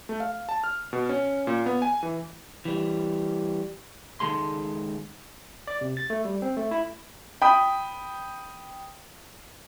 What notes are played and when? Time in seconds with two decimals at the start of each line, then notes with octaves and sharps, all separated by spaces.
0.09 A3
0.20 F5
0.49 A5
0.64 F6
0.93 B2
1.09 C#4
1.47 A#2
1.66 B3
1.82 G#5
2.03 E3
2.65 E3 G3
4.20 C#2 G#2 D#3 G#3 A4 C6
5.67 D5
5.81 C3
5.97 A6
6.10 A3
6.25 G3
6.42 C4
6.57 A3
6.71 E4
7.42 G5 B5 D#6